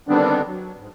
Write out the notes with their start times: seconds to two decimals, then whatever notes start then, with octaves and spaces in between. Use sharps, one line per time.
0.08 D3 D#3 G3 B3 C4 D4
0.47 F#3
0.77 G#2